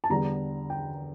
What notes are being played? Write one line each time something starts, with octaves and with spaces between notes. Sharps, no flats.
A5
E2 D3 G3 A#5
G5